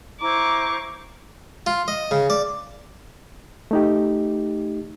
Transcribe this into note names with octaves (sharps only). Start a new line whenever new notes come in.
E4 C5 A#5 C#6 D6
F4
D#5
C#3
D5
A3 D#4 G4